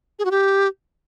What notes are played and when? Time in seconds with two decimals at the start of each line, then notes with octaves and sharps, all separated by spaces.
0.19 G#4
0.25 F#4
0.31 G4